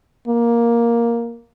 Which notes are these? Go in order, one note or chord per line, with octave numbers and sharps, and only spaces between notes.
A#3